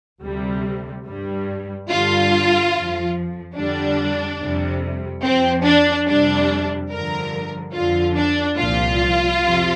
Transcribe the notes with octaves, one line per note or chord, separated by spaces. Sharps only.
D2 C3 G3
G2 G3
G2 D3 G3 F4
F2 F3
F2 D3 G3 D4
F2 C3 G3
F2 F3 C4
D4
F2 C3 G3 D4
G2 D3 F3 A#4
F2 D3 F3 F4
D4
C2 A#2 F3 F4
F2 C3 F3